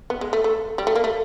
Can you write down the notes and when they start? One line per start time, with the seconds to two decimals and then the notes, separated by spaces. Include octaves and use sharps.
0.10 B3
0.21 G#3
0.33 A3
0.44 A3
0.78 G3
0.87 A3
0.95 A#3
1.04 A3